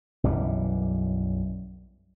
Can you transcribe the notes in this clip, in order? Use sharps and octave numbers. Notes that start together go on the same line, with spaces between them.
B1 F#2 E3 G3